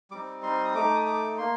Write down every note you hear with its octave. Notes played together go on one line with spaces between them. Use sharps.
G3 C4 D#4 D6
C6
D#6
A3 D#4 D6
D#6
D6
A#3 C6